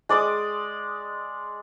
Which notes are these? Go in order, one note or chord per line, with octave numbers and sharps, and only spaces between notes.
G#3 D5 D6 D#6